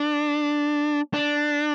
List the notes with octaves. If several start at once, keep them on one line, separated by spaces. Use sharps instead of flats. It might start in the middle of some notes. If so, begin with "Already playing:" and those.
Already playing: D4
D4